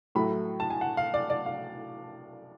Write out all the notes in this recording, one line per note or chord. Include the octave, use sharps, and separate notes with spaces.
A2 F#3 A3 B5
A5
G#5
F#5
F5
D5
D5
F5